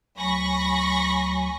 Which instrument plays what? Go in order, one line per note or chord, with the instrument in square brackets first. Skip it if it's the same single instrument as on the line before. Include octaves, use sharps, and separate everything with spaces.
[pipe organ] D2 F#3 G#5 [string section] B5 C#6 A#6